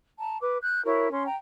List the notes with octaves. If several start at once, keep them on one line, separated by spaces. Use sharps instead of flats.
A5 A#5
B4 D6
F#6 G6
E4 F#4 A#4 C#5
C#4 C6
G5 A#5